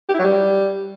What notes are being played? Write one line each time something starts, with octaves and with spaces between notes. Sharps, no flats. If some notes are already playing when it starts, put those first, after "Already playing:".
G4
E4
F#3
G3